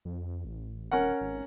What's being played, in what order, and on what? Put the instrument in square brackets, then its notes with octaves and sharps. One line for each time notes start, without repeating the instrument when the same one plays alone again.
[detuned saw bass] F2
A1
[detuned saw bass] D#1 [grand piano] C#4 A#4 F#5
[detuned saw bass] G#1